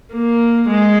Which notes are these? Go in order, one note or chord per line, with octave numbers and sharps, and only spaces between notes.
A#3
G#3